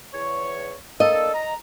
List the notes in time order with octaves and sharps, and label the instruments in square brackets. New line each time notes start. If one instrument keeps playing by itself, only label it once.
[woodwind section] E2 C#5
[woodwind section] A#3 D4 A4 [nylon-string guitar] D#5
[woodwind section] A#5